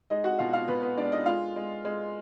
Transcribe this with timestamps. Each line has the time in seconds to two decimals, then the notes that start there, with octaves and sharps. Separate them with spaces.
0.10 G#3 D#4 D#5
0.24 F#4 F#5
0.39 B2 F4 F5
0.53 F4 F5
0.68 B2 B3 B4
0.82 B3 B4
0.97 G#3 D4 D5
1.12 D#4 D#5
1.26 G#3 F4 F5
1.56 G#3
1.85 G#3